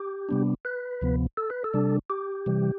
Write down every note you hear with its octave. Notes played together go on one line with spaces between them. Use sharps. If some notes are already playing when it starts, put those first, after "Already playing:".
Already playing: G4
C3 G3 B3 D4
B4
D2 C3 F3 B3
A4
B4
A4
C3 G3 D4
G4
C3 E3 G3